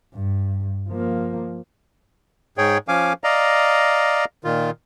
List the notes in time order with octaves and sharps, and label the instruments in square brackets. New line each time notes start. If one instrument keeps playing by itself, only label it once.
[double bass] G2
F3 A#3
[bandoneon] G#2 G#4 C#5 G5
F3 C#4 F5 G#5 D6
D5 D#5 F5 A#5
A#2 D#3 F4